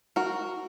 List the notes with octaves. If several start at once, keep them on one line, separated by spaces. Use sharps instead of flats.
F#4 A#4